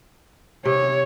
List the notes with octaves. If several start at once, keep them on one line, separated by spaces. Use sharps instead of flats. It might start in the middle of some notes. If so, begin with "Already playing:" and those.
C3 C#5